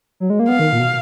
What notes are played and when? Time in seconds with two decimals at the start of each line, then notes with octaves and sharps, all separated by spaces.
0.20 F#3
0.30 G#3
0.39 A#3
0.49 B3 F5
0.59 D#3
0.73 A#2
0.80 B2